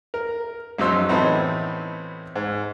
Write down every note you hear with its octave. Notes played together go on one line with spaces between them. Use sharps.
A#4
A#1 F#2 F#3 D#4 C5 E6
A2 E3 B3 C4 D#4
G#2